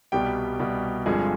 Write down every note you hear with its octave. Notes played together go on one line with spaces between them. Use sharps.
C2 B2 G3 G4 G5
C2 B2 G3
G1 G2 F3 G#3 C4 G#4